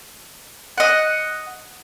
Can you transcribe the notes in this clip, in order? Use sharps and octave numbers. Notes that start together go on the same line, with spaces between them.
D#5 F#5